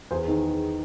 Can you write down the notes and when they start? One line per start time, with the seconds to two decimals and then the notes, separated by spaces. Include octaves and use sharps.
0.11 E2 G#4 C5
0.28 D#3